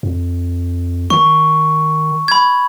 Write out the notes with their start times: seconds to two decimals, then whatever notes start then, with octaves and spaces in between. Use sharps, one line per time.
0.03 F2
1.10 D#3 C#6
2.28 B5 G#6